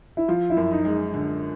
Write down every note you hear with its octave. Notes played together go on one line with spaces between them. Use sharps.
E4
F3 F4
E4
F#2
D#4
G#3
D3